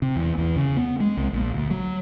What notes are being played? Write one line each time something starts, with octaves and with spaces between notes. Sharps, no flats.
C3
E2
E2
C#3
B3
G#3
C2
A#1
D2
F#3